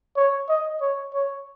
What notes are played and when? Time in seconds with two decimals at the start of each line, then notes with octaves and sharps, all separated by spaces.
0.17 C#5
0.49 D#5
0.81 C#5
1.14 C#5